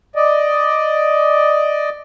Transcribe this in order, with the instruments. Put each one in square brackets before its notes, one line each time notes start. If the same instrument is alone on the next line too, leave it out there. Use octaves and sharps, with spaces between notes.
[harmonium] D5 D#5